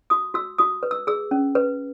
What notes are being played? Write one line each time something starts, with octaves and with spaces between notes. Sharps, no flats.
F#4 D#6
F#4 E6
F#4 D#6
B4
E6
G#4 E6
C#4
B4